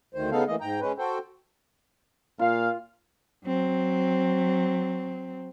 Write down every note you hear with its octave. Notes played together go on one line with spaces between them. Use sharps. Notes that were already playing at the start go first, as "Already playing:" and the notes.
D2 D#3 C5
C#3 B3 D#4 A4 F5
E3 A3 A#3 D#5
G#2 G5 A#5
G#3 C#4 B4
F#4 A4 C5 G5
A#2 F4 F5
F#3 C4